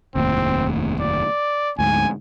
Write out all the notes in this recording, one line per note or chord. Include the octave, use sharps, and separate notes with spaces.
F1 D#2 A2 C4
D5
D2 G#2 G#5